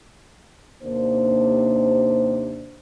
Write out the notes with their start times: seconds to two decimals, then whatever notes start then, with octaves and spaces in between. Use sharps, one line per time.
0.82 D#2 C3 A#3 D4 C5